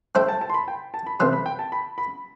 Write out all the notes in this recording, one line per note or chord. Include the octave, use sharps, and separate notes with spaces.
A3 E4 A4 C5 G5
A5
A5
C6
B5
G5
A5
B5
C3 E3 A3 C6
B5
G5
A5
B5
B5